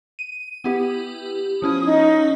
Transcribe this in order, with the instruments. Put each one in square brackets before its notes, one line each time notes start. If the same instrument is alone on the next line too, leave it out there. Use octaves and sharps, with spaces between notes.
[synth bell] D#7
B3 E4 G4
[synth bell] F3 C#4 E4 [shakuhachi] D#6
[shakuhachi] D#4